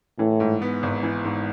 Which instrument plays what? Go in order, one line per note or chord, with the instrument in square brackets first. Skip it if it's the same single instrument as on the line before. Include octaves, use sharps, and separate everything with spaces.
[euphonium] A2 [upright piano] E3
[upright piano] G#2
B3
G#1
E3
G#2